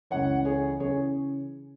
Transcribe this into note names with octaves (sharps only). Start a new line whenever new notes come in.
C#2 C#3 E3 C#5 F#5
G#4 C#5
C#3 E3 G#4 C#5